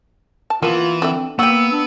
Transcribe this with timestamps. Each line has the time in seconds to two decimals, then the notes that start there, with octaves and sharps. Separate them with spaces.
0.50 A5
0.62 E3 A#3 B3 F4
1.02 D3 C4 E5
1.39 A#3 B3 F#4 G4 E6
1.72 D4